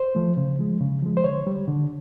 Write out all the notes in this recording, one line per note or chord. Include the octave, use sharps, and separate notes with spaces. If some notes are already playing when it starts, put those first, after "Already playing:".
Already playing: C5
F3 A3
C#3
F3 G#3
C#3
F3 G#3
C5
D3 C#5
G3
D3